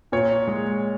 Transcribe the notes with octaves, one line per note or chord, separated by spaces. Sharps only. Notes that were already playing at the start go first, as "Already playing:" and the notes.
A#2 C#5
G#3